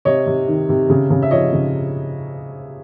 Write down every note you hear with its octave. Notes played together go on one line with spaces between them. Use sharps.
C3 C#5 D#5
C3
D#3
C3
C#3
C#3
E5
F3 C#5 D#5
C#3